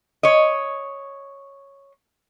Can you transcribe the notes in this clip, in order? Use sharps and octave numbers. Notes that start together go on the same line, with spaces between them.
C#5 D#5